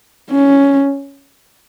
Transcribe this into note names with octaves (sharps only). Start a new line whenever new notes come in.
C#4